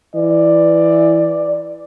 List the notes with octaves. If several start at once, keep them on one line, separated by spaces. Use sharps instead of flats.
E3 D5